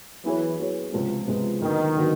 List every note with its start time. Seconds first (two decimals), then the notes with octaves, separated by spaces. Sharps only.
0.24 E3 F#3 B3 E4 G#4 C#5
0.58 F#3 B3 E4 G#4 C#5
0.92 C#2 C3 F3 G#3 B3
1.27 C#2 C3 F3 G#3 B3
1.61 D#2 D3 D#3 F#3 B3
1.97 D3 F#3 B3